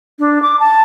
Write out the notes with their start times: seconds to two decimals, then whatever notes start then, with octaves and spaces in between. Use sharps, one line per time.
0.19 D4
0.42 D6
0.59 A5